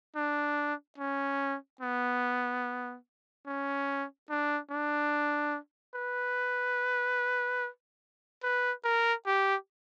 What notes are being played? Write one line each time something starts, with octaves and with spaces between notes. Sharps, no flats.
D4
C#4
B3
C#4
D4
D4
B4
B4
A#4
G4